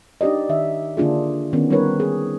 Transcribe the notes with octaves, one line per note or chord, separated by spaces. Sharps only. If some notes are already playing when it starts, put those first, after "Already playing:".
D4 D#4 G4 D5 D#5
D#3 E5
D3 A#3 D4 F4 G#4
D#3 B3 C#4
G3 C4 D#4 A#4 B4 C#5
G#4